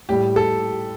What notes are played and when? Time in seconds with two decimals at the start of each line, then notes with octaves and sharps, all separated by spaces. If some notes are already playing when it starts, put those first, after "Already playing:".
0.09 A2 G3 G4
0.36 A4